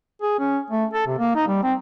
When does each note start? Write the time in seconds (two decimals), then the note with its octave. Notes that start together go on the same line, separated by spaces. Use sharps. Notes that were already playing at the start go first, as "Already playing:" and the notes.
0.22 G#4
0.39 C#4
0.70 A3
0.94 A4
1.07 C3
1.19 A#3
1.35 D#4
1.48 G3
1.63 C4